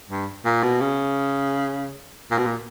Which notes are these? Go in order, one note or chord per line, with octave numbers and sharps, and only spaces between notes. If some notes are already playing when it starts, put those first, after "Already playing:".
G2
A#2
B2
C#3
A#2
B2
A#2